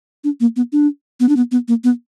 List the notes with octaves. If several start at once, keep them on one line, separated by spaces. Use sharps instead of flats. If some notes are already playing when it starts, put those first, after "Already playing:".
D4
A#3
B3
D4
B3
D4
B3
B3
A#3
B3